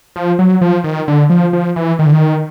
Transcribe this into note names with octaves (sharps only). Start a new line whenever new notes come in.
F3
F#3
F3
D#3
D3
F3
F3
E3
D#3
D3
D#3